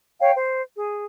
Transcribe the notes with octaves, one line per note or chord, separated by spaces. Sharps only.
C#5 F5 G5
C5
G#4